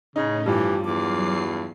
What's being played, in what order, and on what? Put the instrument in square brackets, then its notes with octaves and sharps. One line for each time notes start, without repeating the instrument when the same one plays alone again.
[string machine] A2 C#4 [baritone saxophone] C#3 [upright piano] D#4
[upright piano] G2 F3 [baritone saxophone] E3 [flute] G4
[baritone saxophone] E2 [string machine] F#3 C7 [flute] D6